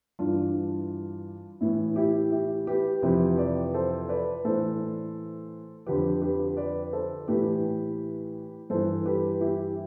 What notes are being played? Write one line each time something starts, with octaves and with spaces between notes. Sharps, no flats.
G2 E3 D4 F4
A2 E3 E4
E4 G4
E4 G4
G4 B4
F2 C3 E3 G4 B4
B4 D5
A4 C5
B4 D5
A2 E3 A4 C5
F2 D3 F3 G4 B4
G4 B4
B4 D5
A4 C5
A2 E3 G4 B4
G2 E3 A4 C5
G4 B4
E4 G4